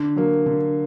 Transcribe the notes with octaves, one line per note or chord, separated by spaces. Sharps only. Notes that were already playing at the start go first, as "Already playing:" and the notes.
Already playing: D3
F#3 A#3
D3